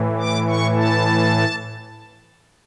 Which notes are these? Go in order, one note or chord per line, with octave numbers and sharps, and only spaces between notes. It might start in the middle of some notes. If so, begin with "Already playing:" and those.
Already playing: A2 E3
D6
C#6
A5